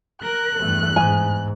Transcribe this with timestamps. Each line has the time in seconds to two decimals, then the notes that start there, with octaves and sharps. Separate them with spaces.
0.22 A#4 F#6
0.62 E2 G2 A3
0.96 G#2 G#5